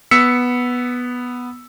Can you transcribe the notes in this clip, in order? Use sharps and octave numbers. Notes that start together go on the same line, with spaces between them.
B3 E6 B6 C#7